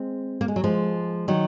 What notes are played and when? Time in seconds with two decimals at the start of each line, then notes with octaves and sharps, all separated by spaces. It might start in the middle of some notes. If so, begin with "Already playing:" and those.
Already playing: G#3 C4
0.41 A#3
0.48 G#3
0.56 F#3
0.64 F3 G#3
1.28 D#3 F#3